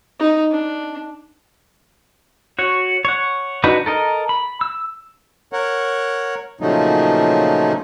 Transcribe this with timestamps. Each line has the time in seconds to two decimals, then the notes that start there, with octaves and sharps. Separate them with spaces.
0.20 D#4
0.51 D4
2.59 F#4 C#5
3.05 C#5 F#5
3.64 D4 D#4 F#4 B4
3.86 A4 A#4 D#5
4.29 B5
4.61 E6
5.53 A#4 C#5 F#5
6.61 A#2 C#3 F3 F#3 A3 D#4